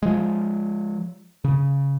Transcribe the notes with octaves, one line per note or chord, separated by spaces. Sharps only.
F3 G#3
C#3